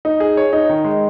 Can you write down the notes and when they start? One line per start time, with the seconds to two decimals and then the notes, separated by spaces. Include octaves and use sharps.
0.05 D#4
0.20 G#4
0.37 C#5
0.53 D#4
0.69 D#3
0.84 G#3